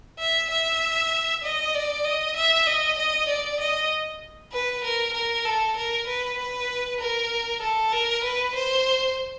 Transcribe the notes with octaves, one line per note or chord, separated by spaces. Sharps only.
E5
E5
D#5
D5
D#5
E5
D#5
D#5
D5
D#5
B4
A#4
A#4
A4
A#4
B4
B4
A#4
A4
A#4
B4
C5